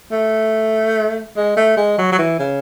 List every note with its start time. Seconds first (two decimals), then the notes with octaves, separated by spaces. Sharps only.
0.12 A3
1.37 G#3
1.57 A3
1.77 G#3
1.98 F#3
2.12 F#3
2.18 E3
2.39 C#3